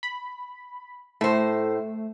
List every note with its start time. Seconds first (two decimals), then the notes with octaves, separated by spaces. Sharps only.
0.03 B5
1.21 A2 A3 C5